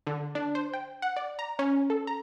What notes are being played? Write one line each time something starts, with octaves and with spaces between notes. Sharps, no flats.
D3
D4
C5
G5
F#5
D5
A#5
C#4
A4
A#5